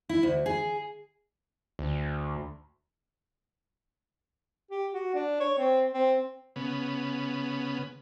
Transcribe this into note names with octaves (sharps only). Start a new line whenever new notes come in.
E4
D2
G#4
D2
G4
F#4
D4
C#5
C4
C4
C#3 B3